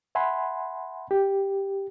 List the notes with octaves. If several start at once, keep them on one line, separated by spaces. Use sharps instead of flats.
E5 F#5 G#5 B5 C6
G4